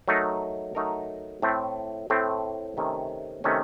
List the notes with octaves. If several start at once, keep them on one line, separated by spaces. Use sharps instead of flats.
F#3 A3 D#4 A#4
F#3 A3 D#4 A#4
A2 A3 C4
A2 A3 C4
C3 D#3 A3 C#4
C3 D#3 A3 C#4